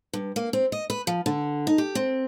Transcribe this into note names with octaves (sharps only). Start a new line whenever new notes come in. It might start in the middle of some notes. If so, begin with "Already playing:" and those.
G2
A#3
C4
D#5
B4
F3
D3
D#4
G4
C4